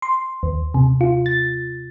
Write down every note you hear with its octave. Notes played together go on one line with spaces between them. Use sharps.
C6
D#2
C3
F4
A6